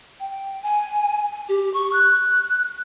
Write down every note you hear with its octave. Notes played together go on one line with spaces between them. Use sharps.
G5
G#5
G4
C#6
F#6